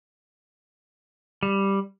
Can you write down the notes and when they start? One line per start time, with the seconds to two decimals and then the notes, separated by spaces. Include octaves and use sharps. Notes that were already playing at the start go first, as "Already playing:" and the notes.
1.43 G3